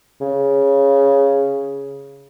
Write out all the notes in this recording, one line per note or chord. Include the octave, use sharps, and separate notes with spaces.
C#3